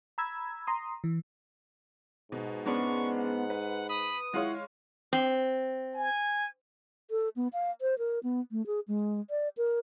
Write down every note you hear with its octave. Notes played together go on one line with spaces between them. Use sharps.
A#5 B5 E6 G#6
A#5 C6 D#6
E3
G#2 B2
G#3 B3 C#4 D4 C#6
F#5
B4
B5 D#6
G#3 E4 F4 C#5 F#5
C4
G#5
A4
B3
F5
C5
A#4
B3
A3
G#4
G#3
D5
A#4